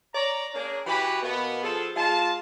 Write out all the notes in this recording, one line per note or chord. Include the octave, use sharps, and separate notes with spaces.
C#5 D5 A#5
A#3 C#4 D4 G#4 A#4
E3 F#4 G4 B4 B5
B2 A#3 B3
F3 G#4 A4
G#3 F4 A5